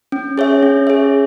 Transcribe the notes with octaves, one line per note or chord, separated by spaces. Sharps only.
C#4
G#4 C#5 E5
C#4
G#4 C#5 E5